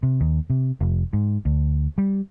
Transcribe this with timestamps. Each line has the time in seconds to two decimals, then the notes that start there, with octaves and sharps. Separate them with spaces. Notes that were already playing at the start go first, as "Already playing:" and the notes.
0.03 C3
0.21 D#2
0.50 C3
0.81 F1
1.13 G#2
1.45 D2
1.98 G3